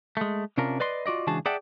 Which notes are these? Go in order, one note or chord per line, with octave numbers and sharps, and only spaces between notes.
G#3 A3
C3 C#4 D4 F4 A#4
B4 D5 D#5 C6
F4 F#4 D5 D#5
C#2 E3 D4 F#4 G#4 A5
G#4 D5 E5 F#5 G5 A5